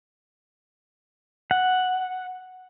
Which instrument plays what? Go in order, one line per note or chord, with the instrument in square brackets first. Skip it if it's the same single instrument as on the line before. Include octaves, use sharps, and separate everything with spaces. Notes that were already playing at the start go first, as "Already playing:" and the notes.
[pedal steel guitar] F#5